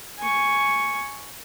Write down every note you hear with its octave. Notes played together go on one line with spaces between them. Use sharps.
G#5 C#6